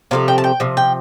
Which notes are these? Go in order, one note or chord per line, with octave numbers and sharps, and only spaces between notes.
C3 F3 A3 F5
G5
A5
G5
C3 F3
G5